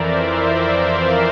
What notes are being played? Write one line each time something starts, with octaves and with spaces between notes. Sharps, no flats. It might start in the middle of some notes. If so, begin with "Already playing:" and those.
Already playing: F2 E3 A#4 C5 D5 E5
D5 F5